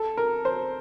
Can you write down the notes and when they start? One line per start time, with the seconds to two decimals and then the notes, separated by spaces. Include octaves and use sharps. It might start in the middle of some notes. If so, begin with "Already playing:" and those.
Already playing: A4
0.17 A#4
0.45 C5